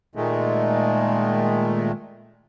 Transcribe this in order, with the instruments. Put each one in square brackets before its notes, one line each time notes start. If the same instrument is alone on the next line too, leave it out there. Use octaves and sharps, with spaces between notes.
[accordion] A#2 D#3 G#3 A3